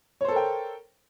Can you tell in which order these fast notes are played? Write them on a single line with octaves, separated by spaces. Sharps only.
C#5 C5 A4 A#4 G5